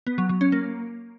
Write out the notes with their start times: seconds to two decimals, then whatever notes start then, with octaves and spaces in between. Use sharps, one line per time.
0.07 B3
0.18 F#3
0.29 F#3
0.41 C#4
0.52 A#3